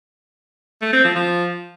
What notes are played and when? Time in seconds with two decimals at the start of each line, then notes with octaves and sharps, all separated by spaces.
0.82 A3
0.93 C4
1.04 F3
1.16 F3